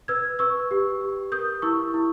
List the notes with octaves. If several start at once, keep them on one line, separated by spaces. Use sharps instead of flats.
B4 E6 G#6
B4 C#6 E6
G4
G4
A#4 D#6 G6
E4 C#6 E6
E4